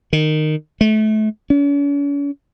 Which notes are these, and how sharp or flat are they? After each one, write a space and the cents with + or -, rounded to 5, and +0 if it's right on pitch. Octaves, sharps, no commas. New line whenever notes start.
D#3 -15
A3 -30
C#4 +45